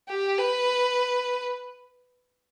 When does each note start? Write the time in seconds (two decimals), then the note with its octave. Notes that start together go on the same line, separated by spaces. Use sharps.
0.09 G4
0.38 B4